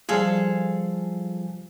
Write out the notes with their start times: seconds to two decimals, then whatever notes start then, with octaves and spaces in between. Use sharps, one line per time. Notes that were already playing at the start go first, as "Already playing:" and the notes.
0.09 F3 G3 F4 G#4 A4 F5